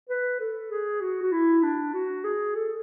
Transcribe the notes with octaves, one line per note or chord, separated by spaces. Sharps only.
B4
A4
G#4
F#4
F#4
E4
D4
F#4
G#4
A4